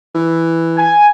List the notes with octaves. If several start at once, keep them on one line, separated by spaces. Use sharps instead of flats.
E3
G#5